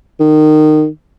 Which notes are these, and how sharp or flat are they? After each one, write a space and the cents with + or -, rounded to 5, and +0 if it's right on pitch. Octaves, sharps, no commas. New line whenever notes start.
D#3 -20